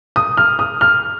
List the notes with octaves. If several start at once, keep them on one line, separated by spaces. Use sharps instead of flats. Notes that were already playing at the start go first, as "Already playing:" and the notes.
D#6
F6
D#6
F6